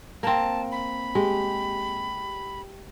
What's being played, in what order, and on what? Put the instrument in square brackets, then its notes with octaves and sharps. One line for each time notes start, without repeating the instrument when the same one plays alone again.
[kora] A#3 C4 [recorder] A5
[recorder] B5
[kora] G#3 [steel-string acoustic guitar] G4